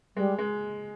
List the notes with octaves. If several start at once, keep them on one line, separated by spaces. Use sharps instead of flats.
G3 G#3
G#3